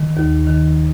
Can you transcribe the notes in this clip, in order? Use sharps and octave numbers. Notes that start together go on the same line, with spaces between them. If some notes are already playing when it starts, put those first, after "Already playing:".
Already playing: D#3
D#2
D#3